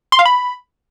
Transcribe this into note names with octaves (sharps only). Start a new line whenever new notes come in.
C6
F5
B5